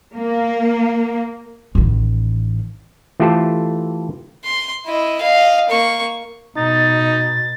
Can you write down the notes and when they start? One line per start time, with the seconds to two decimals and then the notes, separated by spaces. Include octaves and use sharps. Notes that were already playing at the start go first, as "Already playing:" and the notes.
0.15 A#3
1.75 A1 D#3
3.20 E3 A3 F4 G4 A4 C5
4.45 C6
4.86 E4 D#5
5.21 D#5 F5
5.69 A#3 C#6
6.56 B2 D#4 A6